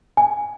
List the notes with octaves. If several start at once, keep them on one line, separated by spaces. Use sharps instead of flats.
G#5